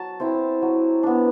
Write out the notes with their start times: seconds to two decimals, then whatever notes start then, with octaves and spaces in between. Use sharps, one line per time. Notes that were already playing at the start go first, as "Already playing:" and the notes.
Already playing: F#3 A5
0.20 C4 E4
0.62 F#3
1.03 B3 D4